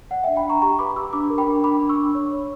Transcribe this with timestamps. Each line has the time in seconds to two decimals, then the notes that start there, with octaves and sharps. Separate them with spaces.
0.11 D5 F#5
0.23 E5 G5
0.28 D4
0.36 G5 B5
0.45 D4 A#5 C#6
0.62 G4 A#5 C#6
0.79 B4 B5 D6
0.96 G4 C#6 E6
1.13 D4 B5 D6
1.30 A#4
1.38 G5 B5
1.47 D4
1.64 D4 B5 D6
1.81 D4
1.89 C#6 E6
1.98 D4
2.15 C#5
2.32 C#5